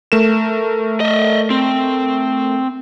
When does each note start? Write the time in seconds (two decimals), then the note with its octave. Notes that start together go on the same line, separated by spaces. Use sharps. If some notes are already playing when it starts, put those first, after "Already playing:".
0.12 A3 A#4 E7
1.00 D#5 E5
1.50 C4